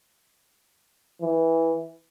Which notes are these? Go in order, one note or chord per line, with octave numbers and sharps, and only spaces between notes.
E3